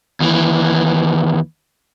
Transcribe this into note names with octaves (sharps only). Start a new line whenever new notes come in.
D#2 E3